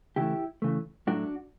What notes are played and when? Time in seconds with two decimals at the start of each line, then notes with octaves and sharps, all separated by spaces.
0.16 C#3 E3 A3 E4 G4
0.62 C#3 E3 A3
1.07 A2 F#3 A3 D4 F#4